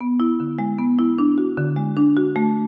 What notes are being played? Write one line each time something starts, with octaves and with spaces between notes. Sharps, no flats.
B3
E4
D3
G#3
B3
E4
D4
F#4
D3
G#3
D4
F#4
A3